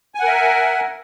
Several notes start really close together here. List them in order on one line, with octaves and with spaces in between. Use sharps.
G#5 F#5 A#4 E5